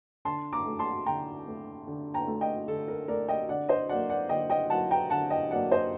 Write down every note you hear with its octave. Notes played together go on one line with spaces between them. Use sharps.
D3 A5 C6
A#5 D6
A3
A5 C6
D3 G5 A#5
A3
D3
G5 A#5
A3
D#5 G5
D3 A4
A#4
A3 A#4 D5
D#5 G5
D3 D5 F#5
C5 D#5
F#3 A#3 D5 F#5
D5 F#5
D3 D#5 G5
D#5 G5
F#3 A#3 F#5 A5
G5 A#5
D3 F#5 A5
D#5 G5
F#3 A#3 D5 F#5
C5 D#5